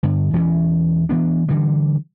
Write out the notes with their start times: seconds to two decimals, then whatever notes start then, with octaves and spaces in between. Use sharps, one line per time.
0.03 G2 D3
0.33 E1 E3 C#4
1.09 E3 B3 D4
1.49 D3 E3 G3